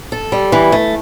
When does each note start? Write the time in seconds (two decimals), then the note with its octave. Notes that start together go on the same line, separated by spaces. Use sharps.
0.12 A4
0.32 G3
0.52 E3
0.72 A3